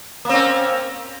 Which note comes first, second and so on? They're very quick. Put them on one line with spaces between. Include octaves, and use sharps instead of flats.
A#3 C4 C#4